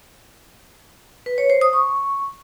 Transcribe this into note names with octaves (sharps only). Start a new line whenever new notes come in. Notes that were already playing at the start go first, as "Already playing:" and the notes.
B4
C#5
C5
D#6
C#6